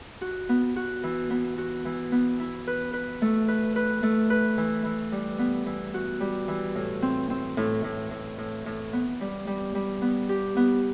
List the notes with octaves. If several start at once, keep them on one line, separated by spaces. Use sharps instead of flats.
F#4
B3
F#4
E3
B3
F#4
E3
B3
E4
B4
B4
A3
B4
B4
A3
B4
E3
E3
G3
B3
E3
F#4
G3
E3
A2
C4
C4
A2
A2
A2
A2
A2
B3
G3
G3
G3
B3
G4
B3